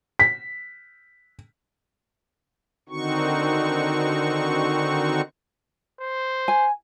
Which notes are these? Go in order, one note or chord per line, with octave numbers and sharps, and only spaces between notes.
B6
D3 D#3 C4 D#4 F#4 C#6
C5
G#5